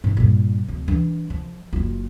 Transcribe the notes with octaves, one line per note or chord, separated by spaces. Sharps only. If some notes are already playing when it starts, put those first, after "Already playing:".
G#2 F3
G2 A#2
D1
E3 D4
F3
F#1 F4